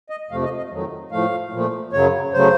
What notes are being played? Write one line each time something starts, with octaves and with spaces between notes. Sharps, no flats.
D#5
F2 C3 F3 A3 F5
D#5
D#5
F2 D#3 F#3 A3
A2 F3 A3 F5
A#2 F3 A3
F#2 C#3 F#3 C#5
C#3 F#3 A3 C5